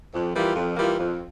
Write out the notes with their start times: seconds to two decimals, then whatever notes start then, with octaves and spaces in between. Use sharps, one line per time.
0.13 F2
0.35 E3 G3 A#3 F4
0.56 F2
0.77 E3 G3 A#3 F4
0.99 F2